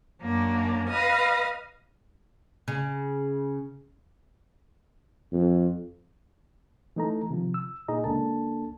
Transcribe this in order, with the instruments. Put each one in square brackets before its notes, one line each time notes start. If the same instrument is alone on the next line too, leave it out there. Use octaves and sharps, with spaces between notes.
[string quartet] F#2 A#3 D4
B4 D#5 F5 D#6 F6
[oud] C#3
[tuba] F2
[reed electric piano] E3 A3 D#4 A4 A#5
C3 D#3 F3
E6
A#2 D#4 G#4 D#5 A#5
C#2 A#3 D4 A4 A5